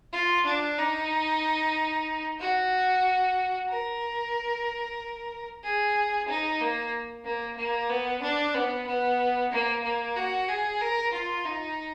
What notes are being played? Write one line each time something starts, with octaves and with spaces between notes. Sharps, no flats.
F4
D4
D#4
F#4
A#4
G#4
D#4
A#3
A#3
A#3
B3
D4
B3
B3
A#3
A#3
F#4
G#4
A#4
F4
D#4